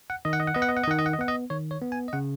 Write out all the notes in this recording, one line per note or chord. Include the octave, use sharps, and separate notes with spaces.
F#5
D#3 D#5
F#5
D#5
F#5
B3 D#5
F#5
D#5
F#5
D#5
D#3 F#5
D#5
F#5
D#5
B3 F#5
D#5
D#3 C#5
C#5
B3
G#5
D#5
C#3 F#5